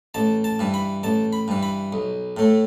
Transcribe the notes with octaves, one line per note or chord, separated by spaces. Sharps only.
A1 A5
A5
G2 E3
B5
A1 A5
B5
G2 E3
B5
B1
A2 A3